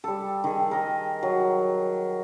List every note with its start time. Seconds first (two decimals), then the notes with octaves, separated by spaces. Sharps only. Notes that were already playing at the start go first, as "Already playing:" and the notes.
0.04 G3 A4
0.44 D#3 G#4
0.71 A#4 D#5
1.23 F#3